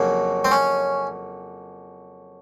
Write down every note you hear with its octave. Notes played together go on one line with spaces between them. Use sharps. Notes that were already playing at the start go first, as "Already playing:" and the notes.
Already playing: F2 C#3 F#3 A#3
C4
C#4